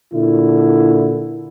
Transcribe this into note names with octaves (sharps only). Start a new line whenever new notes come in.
A#2 D3 E4